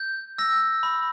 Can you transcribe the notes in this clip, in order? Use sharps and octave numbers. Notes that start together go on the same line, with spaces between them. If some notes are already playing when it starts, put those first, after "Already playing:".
Already playing: G6
E6 A#6
B5